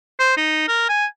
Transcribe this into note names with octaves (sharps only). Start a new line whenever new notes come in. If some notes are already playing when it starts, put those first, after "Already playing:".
C5
D#4
A#4
G#5